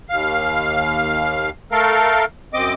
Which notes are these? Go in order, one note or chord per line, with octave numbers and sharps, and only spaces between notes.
D#2 F5
A3 A4 A#4 F5
F#2 C4 D#5 D6